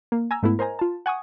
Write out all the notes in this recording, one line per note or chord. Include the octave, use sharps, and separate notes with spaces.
A#3
G#5 A#5 E6
G#2 A3 B3 E4
A#4 C5 D#5 G#5 A#5
F4 A5
F#5 G#5 C#6 D#6